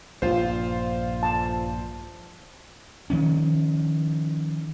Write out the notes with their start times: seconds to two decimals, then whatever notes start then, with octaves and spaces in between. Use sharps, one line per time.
0.22 A#1 G2 F4 C5
1.23 A5
3.10 D#3 F3 C#4